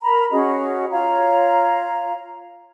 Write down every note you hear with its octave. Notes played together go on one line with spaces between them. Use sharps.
A#4 A#5 B5
C#4 F#4 G#4 D#5
F4 C#5 F5 A#5